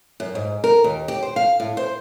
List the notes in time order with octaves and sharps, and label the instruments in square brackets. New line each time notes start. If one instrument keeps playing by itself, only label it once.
[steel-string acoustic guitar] F#2
G#2
A#4
D#2
G4
C5
F5
A2
C5